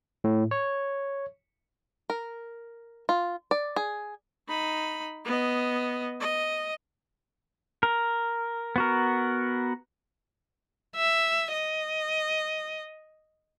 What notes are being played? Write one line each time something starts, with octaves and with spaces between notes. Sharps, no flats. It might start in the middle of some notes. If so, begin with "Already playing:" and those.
A2
C#5
A#4
F4
D5
G#4
D#4 B5
B3 D#5
D#5
A#4
B3 F#4 A#4
E5
D#5